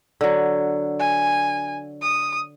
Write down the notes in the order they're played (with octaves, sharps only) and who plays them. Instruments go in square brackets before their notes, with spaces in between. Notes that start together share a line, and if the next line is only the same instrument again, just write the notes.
[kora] D3 F#3
[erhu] G#5
D#6